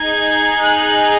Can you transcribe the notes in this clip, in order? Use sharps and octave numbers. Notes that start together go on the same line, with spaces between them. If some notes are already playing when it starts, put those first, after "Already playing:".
Already playing: D#4 G#4 G#6
F#6